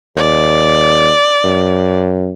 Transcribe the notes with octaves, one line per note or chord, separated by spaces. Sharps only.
D#2 D5
F#2